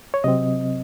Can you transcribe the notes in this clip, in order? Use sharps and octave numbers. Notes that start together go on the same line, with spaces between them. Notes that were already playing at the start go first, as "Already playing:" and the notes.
C#5
C3 F#3 C4 D#5